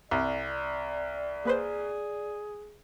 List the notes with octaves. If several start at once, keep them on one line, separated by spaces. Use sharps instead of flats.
C2 D5
A#3 G#4 B4 C5